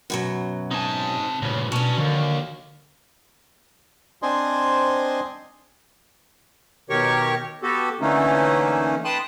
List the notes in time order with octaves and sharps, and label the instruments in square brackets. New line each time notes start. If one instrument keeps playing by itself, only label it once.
[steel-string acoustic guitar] F#2 B2 F#3
[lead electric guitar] C3 A5 [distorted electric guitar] D#4 G#5
[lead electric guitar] D2 G2 [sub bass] A#2 [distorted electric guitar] C#3
[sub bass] B2 [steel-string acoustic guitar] F#3 D4 [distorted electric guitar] C#4 [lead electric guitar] B4 A5
[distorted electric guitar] D#2 [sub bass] D3 [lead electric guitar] F3 A#4
[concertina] C4 D4 C5 D#5 G#5 C6
[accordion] B2 D#3 G4 A#4 C#5 C#6
B3 F#4 G4 A4
D3 E3 A3 A#3 C#4 D#4
B4 G5 A5 C6 D#6 F#6